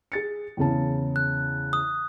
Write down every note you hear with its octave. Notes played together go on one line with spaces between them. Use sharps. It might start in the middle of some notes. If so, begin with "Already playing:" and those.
G#4 A6 C#7
E2 C#3 A5
F#6
D#6